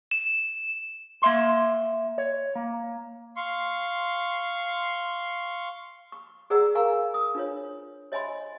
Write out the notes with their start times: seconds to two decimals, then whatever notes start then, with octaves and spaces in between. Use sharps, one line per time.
0.11 E7
1.22 A#3 E5 C6
2.18 C#5
2.55 A#3
3.36 F5 C6 C#6
6.12 C#6
6.50 G#4 B4 D5 F#5 A#5 E6
6.75 A#4 F5 G#5 A#5 C#6
7.14 D#6
7.35 D4 F4 B4 C#5
8.12 C#5 D#5 E5 G#5 B5 C6